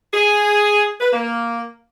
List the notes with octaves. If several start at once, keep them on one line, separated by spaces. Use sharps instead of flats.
G#4
B4
A#3